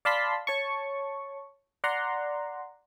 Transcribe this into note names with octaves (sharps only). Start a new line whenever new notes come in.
D5 F5 A5 B5 C6 B6
C#5 A5 C#6
D5 F#5 A#5 C6